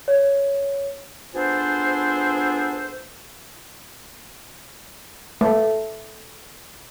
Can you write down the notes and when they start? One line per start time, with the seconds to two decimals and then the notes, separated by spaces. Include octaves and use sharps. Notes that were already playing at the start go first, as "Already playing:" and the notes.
0.08 C#5
1.35 B3 D4 F4 G#4 A4 C5
5.41 A3